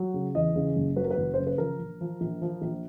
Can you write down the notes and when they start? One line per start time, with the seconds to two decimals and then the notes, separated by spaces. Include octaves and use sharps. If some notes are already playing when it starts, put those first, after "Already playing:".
Already playing: F#3
0.14 C#3
0.35 E2 D#5
0.56 C#3
0.76 F#1
0.96 F#3 B4
1.04 A#4
1.10 B4
1.18 F#1
1.34 C#3 C5
1.47 B4
1.58 F3 A#4
1.79 A#1
2.01 F3
2.21 A#1
2.42 F3
2.62 A#1